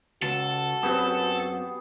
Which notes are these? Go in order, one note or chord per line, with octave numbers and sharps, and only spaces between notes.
C#2 F#4 A4
F#2 B3 C4 G4 G#4